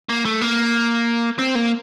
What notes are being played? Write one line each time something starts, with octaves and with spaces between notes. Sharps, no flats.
A#3
A3
A#3
C4
A#3